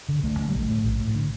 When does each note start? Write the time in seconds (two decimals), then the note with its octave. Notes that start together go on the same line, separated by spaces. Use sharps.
0.09 D3
0.23 D2 A3
0.39 D3 A3
0.49 G3
0.54 A#1 A3
0.69 A2
0.84 A#1
1.00 A2
1.15 D3